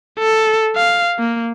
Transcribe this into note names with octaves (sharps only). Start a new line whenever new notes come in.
A4
F5
A#3